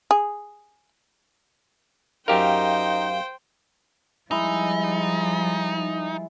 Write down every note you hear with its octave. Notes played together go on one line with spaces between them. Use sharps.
G#4
F#2 D#4 G4 A#4 C5 F5 G5
F3 G3 G#3 D#4 E4